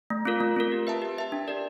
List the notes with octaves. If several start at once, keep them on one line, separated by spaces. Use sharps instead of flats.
A3
C4 F4 A#4
A3
C4 F4 A#4
G4
B4 E5 A5
G4
B4 E5 A5
D4
G4 A#4 D5